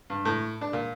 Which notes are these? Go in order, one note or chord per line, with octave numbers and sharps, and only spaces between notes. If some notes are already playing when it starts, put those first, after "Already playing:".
G2
A2
D4
A#2